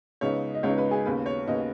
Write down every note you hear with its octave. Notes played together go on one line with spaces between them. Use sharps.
C#2 C#3 B3 D#4 C#5
D#5
C#2 C#3 B3 D#4 C#5
B4
G#4
D#2 C#3 B3 B4
C#5
D#2 C#3 B3 D#5